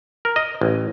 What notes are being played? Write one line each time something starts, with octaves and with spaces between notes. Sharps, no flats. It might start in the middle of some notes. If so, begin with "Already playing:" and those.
A#4
D#5
A1